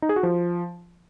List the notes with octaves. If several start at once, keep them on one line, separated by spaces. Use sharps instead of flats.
D#4
G#4
F#4
F3